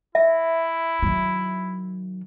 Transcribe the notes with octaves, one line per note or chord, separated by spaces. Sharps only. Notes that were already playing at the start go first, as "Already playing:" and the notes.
E4 E5
D#3 F#3